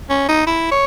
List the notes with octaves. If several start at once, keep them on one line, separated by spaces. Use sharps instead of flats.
C#4
D#4
E4
C#5